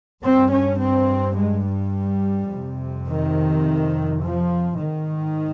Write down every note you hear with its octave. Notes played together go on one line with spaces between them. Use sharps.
G2 C4
C#4
C4
G#3
G3
F2 C3
D#3
F3
G#2 D#3